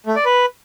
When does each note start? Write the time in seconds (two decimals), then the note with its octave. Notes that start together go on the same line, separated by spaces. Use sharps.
0.06 A3
0.16 D5
0.25 B4